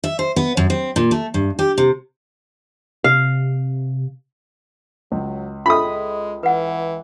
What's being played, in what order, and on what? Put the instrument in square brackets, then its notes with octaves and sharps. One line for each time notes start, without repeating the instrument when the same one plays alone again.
[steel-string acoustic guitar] E5
C5
B3
F#2
C4
A#2
A3
G2
G4
C3
[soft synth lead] C3 [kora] F5
[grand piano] C#2 [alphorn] F#3
[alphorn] G#3 [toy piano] F4 A4 E5 [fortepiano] B5 D#6
[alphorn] E3 [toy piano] B4 F#5